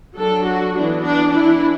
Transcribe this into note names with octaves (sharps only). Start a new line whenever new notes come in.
F#3 D4 A4
F#4
E3 B3 D4
D4
E3 D4 E4